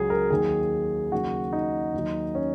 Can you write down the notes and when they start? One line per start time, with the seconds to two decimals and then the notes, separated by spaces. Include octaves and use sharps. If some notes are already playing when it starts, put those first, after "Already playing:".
Already playing: C#2 C#3 F#3 G#4
0.10 A#4
0.30 D#2 D#3 F#3 G#4
1.12 D#2 C#3 F#3 F#4
1.53 D#4
1.94 D#2 D#3 F#3
2.35 C#4